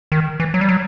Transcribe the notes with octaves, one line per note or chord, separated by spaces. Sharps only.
D#3
E3
F#3
G3
F#3